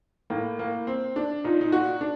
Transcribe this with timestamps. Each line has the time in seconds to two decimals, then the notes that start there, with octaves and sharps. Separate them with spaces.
0.30 A2 A#3
0.59 A#3
0.87 C4
1.16 D4
1.44 A#2 D#4
1.61 D#4
1.72 F#4
2.01 D4